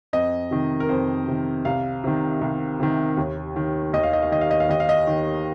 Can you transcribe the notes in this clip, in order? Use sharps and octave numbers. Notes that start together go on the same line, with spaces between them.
F2 D#5
C3 D#3
A#4
F2 C5
C3 D#3
C2 F5
C3 D#3
C2
C3 D#3
D#2
D#3
D#2 D#5
F5
D#5
F5
D#3 D#5
F5
D#5
F5
D#2 D#5
F5
D#5
D#3